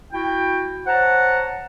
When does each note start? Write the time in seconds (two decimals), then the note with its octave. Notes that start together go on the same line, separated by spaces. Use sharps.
0.13 E4 F#4 G5
0.87 C5 C#5 F#5 A5 A#5